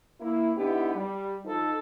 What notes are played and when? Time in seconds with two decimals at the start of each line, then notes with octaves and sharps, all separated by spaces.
0.21 A#3 E4
0.56 D3 B3 D#4 E4 G4
0.96 G3
1.45 F3 D#4 A4